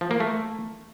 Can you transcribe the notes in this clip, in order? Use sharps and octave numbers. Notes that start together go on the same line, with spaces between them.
F3
A#3
A3